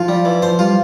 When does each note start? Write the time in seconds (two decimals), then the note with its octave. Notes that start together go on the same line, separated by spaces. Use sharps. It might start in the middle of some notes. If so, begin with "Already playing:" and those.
Already playing: F3 F4
0.08 G3
0.25 E3
0.42 F3 C5
0.59 G3 F4